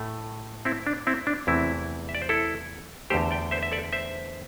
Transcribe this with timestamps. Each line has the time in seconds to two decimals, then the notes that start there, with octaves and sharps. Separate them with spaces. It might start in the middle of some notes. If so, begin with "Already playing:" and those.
Already playing: A2 A3
0.65 C4 E4
0.87 D4
1.07 C4 E4
1.27 D4
1.47 E2 C3 E3 A3 C4 E4
2.09 E5
2.15 D5
2.22 C5
2.29 E4 A4
3.10 E2 D3 A3 G4 C5
3.31 D5 G5
3.51 C5 E5
3.63 E5
3.72 A4 D5
3.93 C5 E5